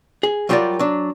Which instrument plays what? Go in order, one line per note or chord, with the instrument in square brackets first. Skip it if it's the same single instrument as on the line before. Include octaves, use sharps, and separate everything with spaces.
[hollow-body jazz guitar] G#4
F#3 G3 F4 G4 A#4 D5
F#3 D4